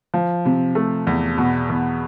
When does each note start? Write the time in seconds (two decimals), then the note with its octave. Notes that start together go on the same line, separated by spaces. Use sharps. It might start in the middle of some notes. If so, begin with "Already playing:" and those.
0.14 F3
0.45 C3
0.75 A3
1.07 E2
1.38 B2
1.69 E2